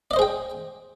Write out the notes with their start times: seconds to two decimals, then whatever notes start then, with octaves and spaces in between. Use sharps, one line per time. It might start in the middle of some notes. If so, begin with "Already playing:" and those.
0.11 D5
0.14 D#5
0.16 C5
0.19 G#4
0.22 G5